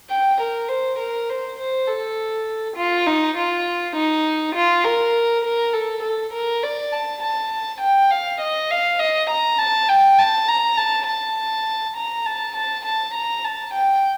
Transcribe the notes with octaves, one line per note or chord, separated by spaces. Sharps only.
G5
A#4
C5
A#4
C5
C5
A4
F4
D#4
F4
D#4
F4
A#4
A#4
A4
A4
A#4
D5
A5
A5
G5
F5
D#5
F5
D#5
A#5
A5
G5
A5
A#5
A5
A5
A#5
A5
A5
A5
A#5
A5
G5